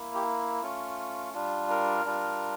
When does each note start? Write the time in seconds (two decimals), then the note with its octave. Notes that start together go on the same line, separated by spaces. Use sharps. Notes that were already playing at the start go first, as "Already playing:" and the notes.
Already playing: A#3 E4
0.15 G4
0.62 A3 C#4 F4
1.33 G3 D4 F4
1.70 A#4
2.05 G3 D4 F4